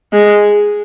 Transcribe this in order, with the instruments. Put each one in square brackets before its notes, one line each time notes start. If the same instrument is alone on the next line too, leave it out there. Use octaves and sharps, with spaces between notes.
[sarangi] G#3